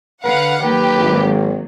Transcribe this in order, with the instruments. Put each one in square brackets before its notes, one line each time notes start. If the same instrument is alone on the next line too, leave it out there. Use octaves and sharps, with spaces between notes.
[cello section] D3 [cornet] B4 [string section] F5 F#5
[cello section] D#3 F#3 A#3 [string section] G4 [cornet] B4
[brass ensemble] G#1